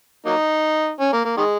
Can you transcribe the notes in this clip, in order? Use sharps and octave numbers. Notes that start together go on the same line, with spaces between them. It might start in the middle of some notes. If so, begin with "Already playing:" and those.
F#3 A#3 D#4
C#4
A#3
A#3
D#3 G#3